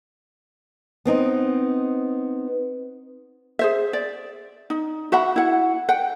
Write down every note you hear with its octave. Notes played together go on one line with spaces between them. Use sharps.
B3 C4 D#4
G#4 C5 E5
D5
D#4
F#4 E5 F#5 B5
E4 F#5
F#5 G5